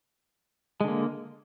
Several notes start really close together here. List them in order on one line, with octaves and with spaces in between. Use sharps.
G#3 D3 A#3